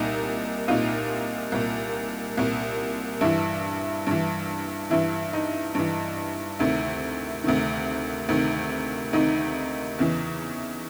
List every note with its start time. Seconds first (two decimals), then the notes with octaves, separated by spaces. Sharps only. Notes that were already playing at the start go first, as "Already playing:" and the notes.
Already playing: C2 A#2 D#4
0.68 C2 A#2 D#4 F4
1.52 C2 A#2
2.37 C2 A#2
3.21 G2 E3 E4
4.07 G2 E3
4.91 G2 E3 E4
5.33 D#4
5.75 G2 E3
6.59 D2 C3 D#3 E4
7.44 D2 C3 D#3
8.29 D2 C3 D#3
9.13 D2 C3 D#3 D#4
9.99 E2 C#3 E3